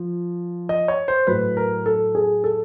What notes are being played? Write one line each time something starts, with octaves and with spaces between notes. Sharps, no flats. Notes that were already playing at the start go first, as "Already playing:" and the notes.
Already playing: F3
D#5
C#5
C5
A2 F#3 B4
A#4
A4
G#4
A4